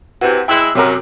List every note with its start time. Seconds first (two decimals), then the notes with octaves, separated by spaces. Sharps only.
0.21 C3 E3 F#4
0.48 G#3 E4 G5 E6 F#6
0.75 F#2 C3 A#4